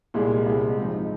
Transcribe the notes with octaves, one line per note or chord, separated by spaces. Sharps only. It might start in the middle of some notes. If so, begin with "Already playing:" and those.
C2 A#2 G#3
C2 C3 G#3 C4
G#1 G#2 F3 C4 D#4